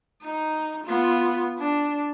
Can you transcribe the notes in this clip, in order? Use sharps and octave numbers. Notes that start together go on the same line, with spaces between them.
D#4
B3 F4
D4